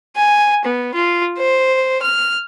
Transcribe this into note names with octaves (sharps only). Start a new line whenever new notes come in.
G#5
B3
F4
C5
F6